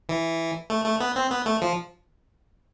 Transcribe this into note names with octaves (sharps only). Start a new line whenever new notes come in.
E3
A3
A3
B3
C4
B3
A3
F3